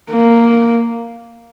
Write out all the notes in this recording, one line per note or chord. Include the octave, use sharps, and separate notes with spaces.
A#3